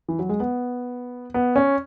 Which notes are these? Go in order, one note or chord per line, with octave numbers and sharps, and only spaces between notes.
E3
F#3
G#3
B3
B3
C#4